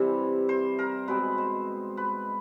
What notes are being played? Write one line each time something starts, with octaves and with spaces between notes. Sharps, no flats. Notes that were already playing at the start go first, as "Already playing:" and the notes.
Already playing: C3 E3 G3 C4 C5
C5
A#4
B2 G#3 C4 B4
C5
B4